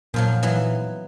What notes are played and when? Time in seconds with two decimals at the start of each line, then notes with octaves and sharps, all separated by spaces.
0.14 F#2 A#2 F3 F#3
0.43 E3 F#3 B3